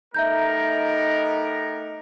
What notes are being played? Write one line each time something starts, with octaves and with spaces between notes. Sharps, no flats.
A3 B3 D#4 G4 A#4 E5 A#5 G6